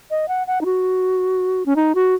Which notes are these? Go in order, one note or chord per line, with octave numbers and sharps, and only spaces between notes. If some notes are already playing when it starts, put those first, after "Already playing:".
D#5
F#5
F#5
D#4
F#4
C#4
D#4
F#4